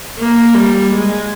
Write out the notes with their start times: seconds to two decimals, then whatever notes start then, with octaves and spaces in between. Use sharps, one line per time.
0.18 A#3
0.55 G3
0.93 G#3